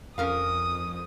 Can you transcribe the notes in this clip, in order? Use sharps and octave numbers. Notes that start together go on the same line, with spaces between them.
F2 C#4 A#4 F5 D#6